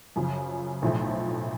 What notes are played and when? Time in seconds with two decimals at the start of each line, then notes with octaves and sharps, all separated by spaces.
0.16 F#2 C#3 F3
0.82 B1 A2 F3 A3